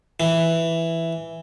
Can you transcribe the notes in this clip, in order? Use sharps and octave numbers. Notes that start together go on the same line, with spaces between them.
E3